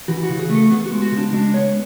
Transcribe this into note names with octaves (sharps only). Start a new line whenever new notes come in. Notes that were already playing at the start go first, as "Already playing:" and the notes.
E3 F#4
F#4
C#3
G#4
A3
A4
B3 G#4
F#4
G#3
F#4
C#3
D4
G#3 D4
B3 C#5